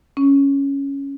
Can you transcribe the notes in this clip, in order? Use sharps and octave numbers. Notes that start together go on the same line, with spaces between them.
C#4